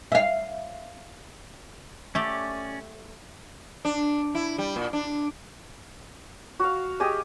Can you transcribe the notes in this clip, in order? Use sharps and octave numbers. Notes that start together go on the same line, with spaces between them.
E5 F5
A3 C#4 G4 D5
D4
E4
G3
A#2
D4
F#4 F5
G4 G#4 D#5